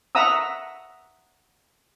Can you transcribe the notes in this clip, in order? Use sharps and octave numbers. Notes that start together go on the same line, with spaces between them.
E5 F#5 A#5 D#6 E6